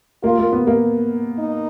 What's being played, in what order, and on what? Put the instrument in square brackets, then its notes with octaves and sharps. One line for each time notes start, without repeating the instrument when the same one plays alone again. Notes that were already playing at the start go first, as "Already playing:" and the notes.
[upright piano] A#3 [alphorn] F4
[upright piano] A#3
B3
A#3
[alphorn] D#4